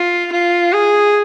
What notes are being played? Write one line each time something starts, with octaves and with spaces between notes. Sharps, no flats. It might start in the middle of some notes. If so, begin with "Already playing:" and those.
Already playing: F4
F4
G#4